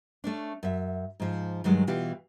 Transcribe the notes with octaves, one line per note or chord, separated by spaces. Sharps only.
A3 C#4 D4
F#2 E5
G#2 F3
G2 D#3 F#3 G#3
B2 E3 F4 G4